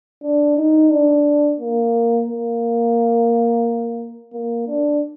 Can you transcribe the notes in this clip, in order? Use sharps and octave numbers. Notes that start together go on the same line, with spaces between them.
D4
D#4
D4
A#3
A#3
A#3
D4